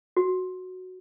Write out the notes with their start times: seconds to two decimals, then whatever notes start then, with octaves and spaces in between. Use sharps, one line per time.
0.17 F#4